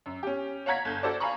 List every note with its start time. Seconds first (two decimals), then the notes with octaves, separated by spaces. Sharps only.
0.06 F#2
0.23 C#4 G4
0.66 C#5 F5 F#5 A#5 G#6 B6
0.85 G1 G6
1.03 F#4 A4 C5 D5
1.20 F5 G#5 A#5 B5 C#6